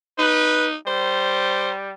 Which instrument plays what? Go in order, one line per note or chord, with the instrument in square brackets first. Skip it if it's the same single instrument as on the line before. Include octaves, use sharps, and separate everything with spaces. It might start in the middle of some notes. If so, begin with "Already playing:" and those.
[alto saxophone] D#4 [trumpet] B4
[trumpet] G3 [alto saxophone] C5